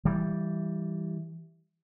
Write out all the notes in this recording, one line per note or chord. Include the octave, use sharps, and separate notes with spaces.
E3 G3